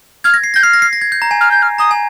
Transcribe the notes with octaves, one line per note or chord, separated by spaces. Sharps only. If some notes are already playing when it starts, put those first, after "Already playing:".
F6 G#6
A#6
C7
G6 A#6
F6 C7
A#6
C7
A#6
G#6
G6
A#5
G#5
F6
G6
F6
A#5 D#6
G#5